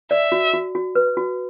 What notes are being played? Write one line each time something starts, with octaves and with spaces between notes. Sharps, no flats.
D5 E5
F#4
F#4
F#4
B4
F#4